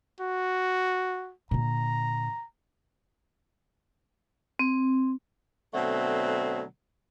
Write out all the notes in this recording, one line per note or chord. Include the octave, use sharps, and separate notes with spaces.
F#4
A#2 D3 A#5
C4
B2 D3 F#3 A3 C4